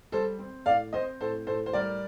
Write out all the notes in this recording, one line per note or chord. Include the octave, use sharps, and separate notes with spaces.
G3 A4 C5
C4
A2 D5 F5
C4 C5 D#5
A2 A4 C5
A2 A4 C5
C5
G3 A#4 D5